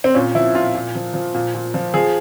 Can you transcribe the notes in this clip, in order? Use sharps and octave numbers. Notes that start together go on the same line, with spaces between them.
C4
A#2 C#4
F3 E4
A#2 F4
A#2
F3
F3
A#2
A#2
F3
F3 G#4